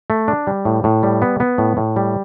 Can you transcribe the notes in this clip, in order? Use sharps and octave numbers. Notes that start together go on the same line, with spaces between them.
A3
D4
G3
A2
A2
G3
B3
B3
A2
A2
G3